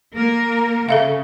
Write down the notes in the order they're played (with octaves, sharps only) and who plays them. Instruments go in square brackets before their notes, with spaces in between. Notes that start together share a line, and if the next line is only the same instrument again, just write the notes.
[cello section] A#3 A#4
[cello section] C#3 [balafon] A4 E5 F5